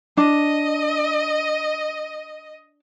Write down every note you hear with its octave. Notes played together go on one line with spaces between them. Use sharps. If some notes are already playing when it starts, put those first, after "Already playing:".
D4 D#5